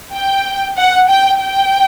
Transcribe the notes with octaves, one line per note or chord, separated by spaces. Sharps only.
G5
F#5
G5
G5